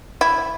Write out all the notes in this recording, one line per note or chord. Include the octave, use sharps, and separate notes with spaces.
E4